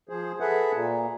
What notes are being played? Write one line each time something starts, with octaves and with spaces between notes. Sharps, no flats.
F3 G#4 C5
G#4 A4 B4 E5 F#5
A#2